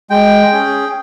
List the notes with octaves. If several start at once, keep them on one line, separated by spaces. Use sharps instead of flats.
G#3 G5
C#4 G#4